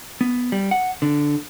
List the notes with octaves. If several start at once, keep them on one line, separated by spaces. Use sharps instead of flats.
B3
G3
F#5
D3